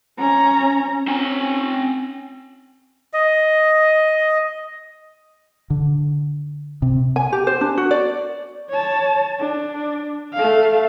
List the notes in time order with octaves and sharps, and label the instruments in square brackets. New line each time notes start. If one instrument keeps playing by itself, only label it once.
[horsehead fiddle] C#4 A#5
[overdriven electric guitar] C4 G#5 [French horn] C#4
[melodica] D#5
[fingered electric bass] D3
C3
[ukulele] G#5
G4
C5
D4
F#4
D5
[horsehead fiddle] C#5 A5
D4
A3 F5